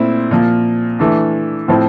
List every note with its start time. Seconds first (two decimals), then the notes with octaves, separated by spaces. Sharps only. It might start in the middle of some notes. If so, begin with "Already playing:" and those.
Already playing: A#2 A3 C4 E4
0.31 A#2 F3 A#3
0.99 E3 A3 D4
1.68 A2 F3 C4 E4